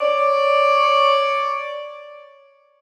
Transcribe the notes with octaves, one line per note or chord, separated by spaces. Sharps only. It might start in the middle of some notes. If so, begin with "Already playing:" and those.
C#5 D5